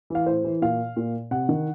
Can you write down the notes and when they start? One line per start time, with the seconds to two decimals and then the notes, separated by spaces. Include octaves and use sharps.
0.10 E3 F5
0.26 A2 C5
0.44 E3
0.62 A#2 F5
0.96 A#2
1.31 C3 F#5
1.49 D#3